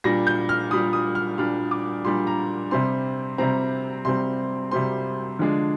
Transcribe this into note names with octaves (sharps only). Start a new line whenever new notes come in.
A#2 G3 D4 A#6
G6
F6
A#2 G3 D4 D#6
D#6
F6
A#2 G3 D4 F6
D6
A#2 G3 D4 C6
A#5
C3 G3 C4 C6
C3 G3 C4 A#5
C3 G3 C4 C6
C3 G3 C4 C6
D3 F3 G#3 D4